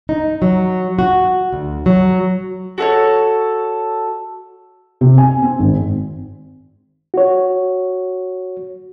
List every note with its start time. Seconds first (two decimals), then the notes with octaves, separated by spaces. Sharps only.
0.09 D#4
0.42 F#3
0.99 F#4
1.52 D2
1.86 F#3
2.78 F#4 A4 B4 C#5
5.01 C3
5.18 G#5
5.42 C4
5.59 G#1
7.14 F#4 C#5